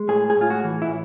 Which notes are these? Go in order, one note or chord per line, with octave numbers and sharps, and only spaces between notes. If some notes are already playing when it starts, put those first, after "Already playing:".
Already playing: G#3
A2 G#4
G#4
A2
F4
F#4
E3
E4